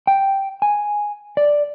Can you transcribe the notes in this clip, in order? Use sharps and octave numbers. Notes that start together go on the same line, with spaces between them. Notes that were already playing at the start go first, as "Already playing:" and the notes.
G5
G#5
D5